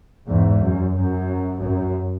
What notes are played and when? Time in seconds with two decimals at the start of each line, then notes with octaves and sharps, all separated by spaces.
0.27 E2 G#2
0.60 F#2
0.94 F#2
1.60 F#2